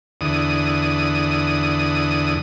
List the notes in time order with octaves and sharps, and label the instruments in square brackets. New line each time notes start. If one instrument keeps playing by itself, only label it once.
[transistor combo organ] E2 D3 D#6